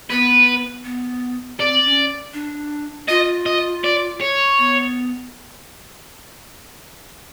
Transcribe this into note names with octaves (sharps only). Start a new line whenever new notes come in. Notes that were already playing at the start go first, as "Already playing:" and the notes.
B3 B4
B3
C4 D5
C#4
D4
F4 D#5
D#5
D5
C#5
B3